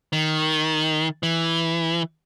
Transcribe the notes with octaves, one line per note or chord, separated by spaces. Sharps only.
D#3
E3